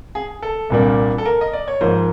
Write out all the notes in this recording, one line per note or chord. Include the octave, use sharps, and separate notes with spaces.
G#4
A4
C2 A#2 G3 A#3 D4
A4
A#4
D#5
D5
C#5
G#2 F3 A#3 C5